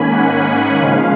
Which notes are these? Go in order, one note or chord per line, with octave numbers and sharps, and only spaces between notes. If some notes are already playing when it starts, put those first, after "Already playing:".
Already playing: G#2 D#3 A#3 C#4 G#5 B5
F#5
C#3 F3 G#3 C#4 F5